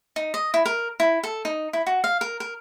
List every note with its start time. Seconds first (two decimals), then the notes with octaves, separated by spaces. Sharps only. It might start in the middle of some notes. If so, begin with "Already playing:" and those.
0.16 D#4
0.34 D#5
0.54 E4
0.66 A#4
1.00 E4
1.23 A4
1.45 D#4
1.73 E4
1.86 F#4
2.04 F5
2.21 A#4
2.40 A#4